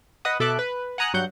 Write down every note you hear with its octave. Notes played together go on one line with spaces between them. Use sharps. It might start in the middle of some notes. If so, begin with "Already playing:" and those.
B4 D#5 F#5 D#6
B2 A4 E5 D6 F#6
B4
F#5 G#5 A#5 D#6 F#6
G2 F#3 F#5 G6